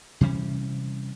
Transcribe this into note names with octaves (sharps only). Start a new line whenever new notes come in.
C3 E3 G3 C#4